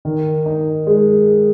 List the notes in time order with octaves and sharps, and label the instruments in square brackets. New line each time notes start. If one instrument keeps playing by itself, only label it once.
[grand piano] D#3
D#4
G#3